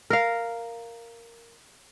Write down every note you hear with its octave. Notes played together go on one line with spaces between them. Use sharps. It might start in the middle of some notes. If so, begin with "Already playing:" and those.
A#4 F5